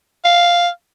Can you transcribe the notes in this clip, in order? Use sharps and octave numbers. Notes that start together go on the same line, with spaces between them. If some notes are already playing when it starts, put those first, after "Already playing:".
F5